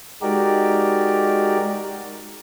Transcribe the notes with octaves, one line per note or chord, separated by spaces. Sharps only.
G#3 D#4 F#4 G4 A#4 D5